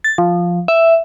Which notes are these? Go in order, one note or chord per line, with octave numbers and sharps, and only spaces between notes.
A6
F3
E5